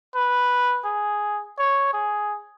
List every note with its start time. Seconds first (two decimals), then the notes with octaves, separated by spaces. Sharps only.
0.15 B4
0.85 G#4
1.58 C#5
1.93 G#4